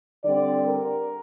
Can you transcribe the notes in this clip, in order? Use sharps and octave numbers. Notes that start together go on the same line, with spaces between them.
D3 G3 C4 D5
A#4